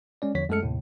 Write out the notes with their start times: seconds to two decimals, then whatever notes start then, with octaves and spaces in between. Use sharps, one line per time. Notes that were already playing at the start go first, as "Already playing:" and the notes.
0.22 G#3 C#4 D5
0.35 E2 D3 F3 C#5 B6
0.49 F#2 G#3 A3 A4 F6 C#7
0.62 D#2 A2 C3